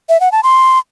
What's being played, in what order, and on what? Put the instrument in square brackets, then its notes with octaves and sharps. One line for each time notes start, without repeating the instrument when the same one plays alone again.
[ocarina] E5
F#5
A5
C6